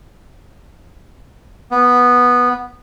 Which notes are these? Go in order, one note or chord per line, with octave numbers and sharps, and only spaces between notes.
B3